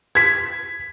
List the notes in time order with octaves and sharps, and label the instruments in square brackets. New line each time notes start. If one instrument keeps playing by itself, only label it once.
[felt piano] G#6 B6